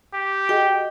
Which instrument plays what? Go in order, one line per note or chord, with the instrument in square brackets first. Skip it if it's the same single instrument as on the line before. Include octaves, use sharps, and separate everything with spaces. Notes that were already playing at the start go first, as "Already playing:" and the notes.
[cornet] G4
[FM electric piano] F#4 G#4 D#5 [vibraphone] G5